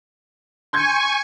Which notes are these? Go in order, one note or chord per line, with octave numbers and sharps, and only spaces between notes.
G#5 C6 C#6 G6 G#6